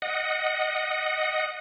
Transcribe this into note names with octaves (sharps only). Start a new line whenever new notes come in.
D#5 F#5